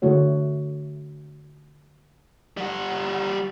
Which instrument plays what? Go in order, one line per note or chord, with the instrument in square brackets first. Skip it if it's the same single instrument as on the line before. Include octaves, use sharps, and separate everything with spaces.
[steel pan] D3 A3 E4 F#4 C#5
[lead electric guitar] G3 F#5